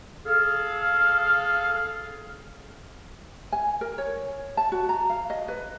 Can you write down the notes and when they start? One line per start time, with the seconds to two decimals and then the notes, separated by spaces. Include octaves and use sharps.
0.26 G#4 A4 F5
3.52 G#5
3.81 A#4
3.98 C#5
4.57 A5
4.72 F#4
4.89 A#5
5.09 F5
5.30 D#5
5.48 B4